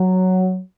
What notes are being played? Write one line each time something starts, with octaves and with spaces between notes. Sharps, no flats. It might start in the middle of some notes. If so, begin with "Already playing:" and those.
Already playing: F#3